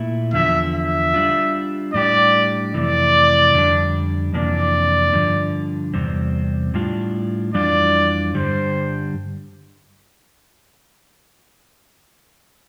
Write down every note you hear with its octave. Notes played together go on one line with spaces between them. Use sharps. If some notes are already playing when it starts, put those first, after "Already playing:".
Already playing: A#2 A3 E4
E2 D3 F3 E5
E5
G3 D4 F4
A2 G3 D4 G4 D5
F2 C3 E3 A3 D5
F2 D3 G3 D4
F2 C3 E3 A#3 D4 D5
G2 D3 F3
E2 C3 G3 C4
A2 G3 D4 F4
F2 E3 G3 D4 F4 D5
G2 D3 G3 C5